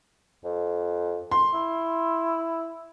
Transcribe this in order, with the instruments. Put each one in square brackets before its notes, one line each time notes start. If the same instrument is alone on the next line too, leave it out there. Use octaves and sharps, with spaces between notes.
[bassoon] F2
[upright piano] C6
[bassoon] E4